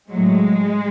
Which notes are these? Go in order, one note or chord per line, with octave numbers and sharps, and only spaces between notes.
A2 F#3 G#3